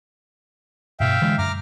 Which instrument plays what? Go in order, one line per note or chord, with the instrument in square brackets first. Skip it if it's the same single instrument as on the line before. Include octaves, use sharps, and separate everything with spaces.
[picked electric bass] G2 B2 [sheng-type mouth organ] E5 F5 G5
[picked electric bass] D3 E3 G#3
[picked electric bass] F#2 [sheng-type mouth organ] A#5 D6 F6